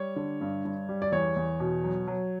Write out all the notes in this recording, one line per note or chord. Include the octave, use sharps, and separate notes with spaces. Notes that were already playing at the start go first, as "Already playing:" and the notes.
Already playing: G3 C#5
D3
G2
G2
G3
D5
E2 C#5
E2
B2
F#3
F#3